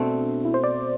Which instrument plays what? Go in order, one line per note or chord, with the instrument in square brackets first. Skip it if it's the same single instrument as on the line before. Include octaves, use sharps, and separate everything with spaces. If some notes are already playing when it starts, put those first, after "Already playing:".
Already playing: [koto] B2 A3 C4 [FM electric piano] D4
[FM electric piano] E4
C5
D5